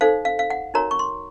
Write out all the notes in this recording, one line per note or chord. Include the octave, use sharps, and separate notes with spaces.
D#4 A4 C5 F5
F5
F5
F#5
D#4 F#4 A#4 C#5 A#5
C#6
C6